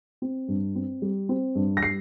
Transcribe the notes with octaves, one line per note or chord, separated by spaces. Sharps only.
C4
G2
C4
G3
C4
G2
A#6
G3 C7